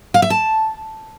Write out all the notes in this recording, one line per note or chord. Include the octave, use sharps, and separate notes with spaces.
F5
E5
A5